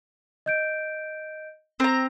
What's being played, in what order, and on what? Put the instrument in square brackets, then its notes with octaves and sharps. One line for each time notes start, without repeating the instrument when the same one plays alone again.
[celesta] D#5 G6 D7
[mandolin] C4 A#5